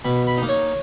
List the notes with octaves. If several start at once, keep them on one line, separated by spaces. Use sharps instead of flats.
B2 B5
B5
A#3 D#4
C#5